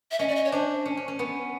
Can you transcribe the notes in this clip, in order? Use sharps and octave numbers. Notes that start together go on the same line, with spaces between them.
E5
C#4 D#5
D5
D#5
C#5
D4 C5
C#4
C#4
C#4
B3